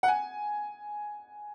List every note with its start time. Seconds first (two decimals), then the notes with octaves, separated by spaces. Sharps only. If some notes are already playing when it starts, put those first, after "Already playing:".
0.03 F#5
0.08 G#5